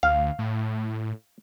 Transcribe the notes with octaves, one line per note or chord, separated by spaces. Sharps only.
D2 F5
A2